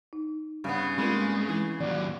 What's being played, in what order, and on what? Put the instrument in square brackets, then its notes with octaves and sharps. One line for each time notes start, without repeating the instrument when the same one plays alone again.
[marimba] D#4
[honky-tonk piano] G2 [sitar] C#3 B3
[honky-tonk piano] G2 A#3 [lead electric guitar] G#3 [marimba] C4 F4
[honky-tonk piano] E3
[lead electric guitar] D#2 F#3 [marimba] D5